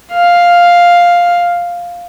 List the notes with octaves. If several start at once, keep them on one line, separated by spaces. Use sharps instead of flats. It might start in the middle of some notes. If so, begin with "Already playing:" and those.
F5